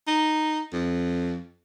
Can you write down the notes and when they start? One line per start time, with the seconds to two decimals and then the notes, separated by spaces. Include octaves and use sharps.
0.07 D#4
0.73 F2